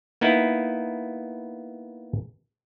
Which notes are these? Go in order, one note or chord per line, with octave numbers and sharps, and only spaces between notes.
A#3 B3 D#4 E4